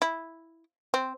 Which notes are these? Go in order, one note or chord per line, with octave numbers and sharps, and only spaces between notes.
E4
C4